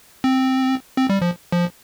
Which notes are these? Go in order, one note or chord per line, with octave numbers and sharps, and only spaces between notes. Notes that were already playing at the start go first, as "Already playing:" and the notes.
C4
C4
G3
F3
F3